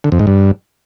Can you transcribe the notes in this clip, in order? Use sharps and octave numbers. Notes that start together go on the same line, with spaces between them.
D3
F2
G#2
G2